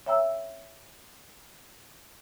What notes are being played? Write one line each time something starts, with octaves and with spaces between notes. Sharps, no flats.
C#5 E5 G5 A#5 E6